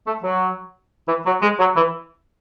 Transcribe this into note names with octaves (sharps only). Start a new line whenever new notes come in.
A3
F#3
E3
F#3
G#3
F#3
E3